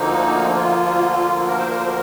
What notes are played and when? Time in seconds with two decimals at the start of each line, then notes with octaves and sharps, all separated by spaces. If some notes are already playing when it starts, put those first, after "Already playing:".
Already playing: D2 D3 F3 A#3 D#4
0.56 F4
1.47 A#4
1.58 C5
1.67 A#4
1.77 C5
1.87 A#4